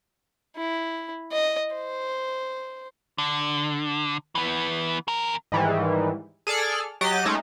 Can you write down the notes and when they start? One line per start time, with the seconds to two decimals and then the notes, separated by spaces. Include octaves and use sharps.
0.57 E4
1.33 D#5
1.75 C5
3.18 D3
4.35 E3 B3
5.08 E2 A#4
5.52 G#2 D#3 E3 G3
6.47 G#4 A4 D5 F6
7.01 F#3 G4 D#5 F#6 A6
7.25 G#3 A3 C#4 D#4